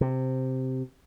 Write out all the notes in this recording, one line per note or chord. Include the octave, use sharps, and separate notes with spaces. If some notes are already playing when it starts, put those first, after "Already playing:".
C3